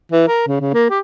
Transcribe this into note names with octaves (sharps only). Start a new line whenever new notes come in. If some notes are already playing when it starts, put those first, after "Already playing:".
E3
A#4
C#3
C#3
A#3
G4